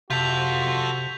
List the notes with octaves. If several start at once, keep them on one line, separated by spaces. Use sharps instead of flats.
C3 F4 F#4 A4 G6 B6 F7